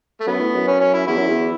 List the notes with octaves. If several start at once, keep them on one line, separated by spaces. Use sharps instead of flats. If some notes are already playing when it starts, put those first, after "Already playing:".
A3
F#2 B3
A2
F#2
C#4
C#4
E4
E2 E4
F#2
E2